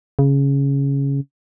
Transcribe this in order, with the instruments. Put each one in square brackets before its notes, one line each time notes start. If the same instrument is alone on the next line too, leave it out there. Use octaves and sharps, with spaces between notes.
[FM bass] C#3